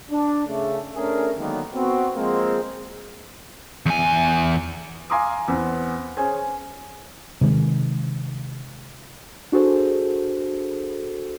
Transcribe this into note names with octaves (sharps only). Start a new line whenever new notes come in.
D4
C#3 A3
A3 C#4 D4 G#4 A#4
D3 D#3 F#3 G#3 A#3 B3
B3 C4 F#4
F3 G#3 A#3 C4
E2 G#5
F5 G#5 A#5 C6 D6 D#6
E2 B3 C4
C#4 G#4 C5 G#5
C3 D#3 G#3
D4 F#4 G#4 A4 C5